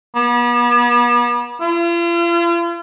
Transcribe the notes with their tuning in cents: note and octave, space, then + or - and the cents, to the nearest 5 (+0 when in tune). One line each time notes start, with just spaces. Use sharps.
B3 -40
F4 -40